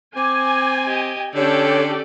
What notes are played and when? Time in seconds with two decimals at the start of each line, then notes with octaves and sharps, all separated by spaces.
0.16 C4 G#5 D6
0.87 G4 D#5 G5
1.35 D3 C#4 G4 A4 C#5 D5